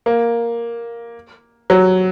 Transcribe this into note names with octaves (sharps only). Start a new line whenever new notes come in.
A#3
F#3